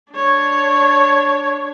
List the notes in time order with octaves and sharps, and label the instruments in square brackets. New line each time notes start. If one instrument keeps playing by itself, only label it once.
[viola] D4 C#5